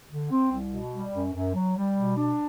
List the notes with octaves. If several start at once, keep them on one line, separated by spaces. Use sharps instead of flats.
D3
C4
C2
B2
G3
F#2
F#2
F#3
G3
B2
D4